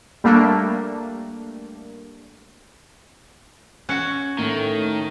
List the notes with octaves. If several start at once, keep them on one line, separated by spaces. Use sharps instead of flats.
G3 A3 A#3 D4
C#4 F#4 F#6 C#7
A2 D#3 A3